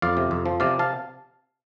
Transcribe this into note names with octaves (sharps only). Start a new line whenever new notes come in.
F2 D5 F5
C3
F2
F3
C3 D5 F5
F5 A5